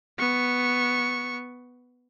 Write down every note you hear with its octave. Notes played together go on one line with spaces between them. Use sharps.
B3 C#6